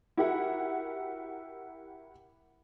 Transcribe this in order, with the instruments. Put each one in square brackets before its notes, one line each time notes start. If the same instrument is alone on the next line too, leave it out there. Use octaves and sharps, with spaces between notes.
[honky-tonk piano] E4 F#4 G4 A#4 E5 F#5